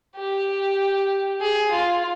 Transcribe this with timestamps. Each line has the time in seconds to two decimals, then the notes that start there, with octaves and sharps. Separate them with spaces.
0.16 G4
1.41 G#4
1.71 F4